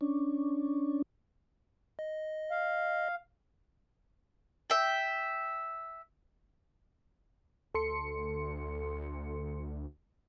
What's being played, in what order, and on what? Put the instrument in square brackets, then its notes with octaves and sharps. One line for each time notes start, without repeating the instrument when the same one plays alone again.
[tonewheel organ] C#4 D4
[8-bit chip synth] D#5
[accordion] F5
[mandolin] E5 G5
[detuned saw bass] D2 [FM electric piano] A4 C6 C#7